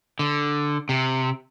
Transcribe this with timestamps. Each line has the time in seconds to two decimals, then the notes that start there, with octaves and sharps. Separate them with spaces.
0.19 D3
0.89 C3